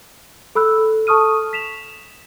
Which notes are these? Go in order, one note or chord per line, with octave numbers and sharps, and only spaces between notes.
A4 B5 E6 F#6
A4
A4 A5 C#6 D#6 F6 D#7
B6 E7 F7